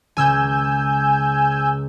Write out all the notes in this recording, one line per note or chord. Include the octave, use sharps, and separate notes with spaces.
C#2 C#3 G#5 E6 G6